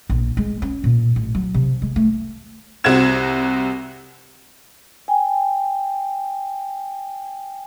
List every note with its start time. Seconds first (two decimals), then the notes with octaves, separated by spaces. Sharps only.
0.09 A#1
0.37 G#3
0.62 C#4
0.84 A#2
1.16 A1
1.35 F#3
1.54 C3
1.82 G#3
1.96 A3
2.84 C2 C4 F#4 F#5 G#6 E7
5.08 G5 G#5